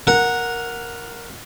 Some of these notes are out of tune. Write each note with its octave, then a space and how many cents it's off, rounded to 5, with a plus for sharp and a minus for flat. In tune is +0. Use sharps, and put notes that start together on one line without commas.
A#4 +0 F#5 -10